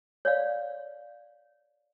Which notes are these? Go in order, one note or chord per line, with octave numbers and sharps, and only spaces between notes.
C#5 D5 F5